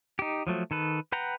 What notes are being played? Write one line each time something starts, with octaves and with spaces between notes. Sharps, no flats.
D#4 G4
F3 F#3 A3
D#3 A4 B4
B4 F#5 G5 A#5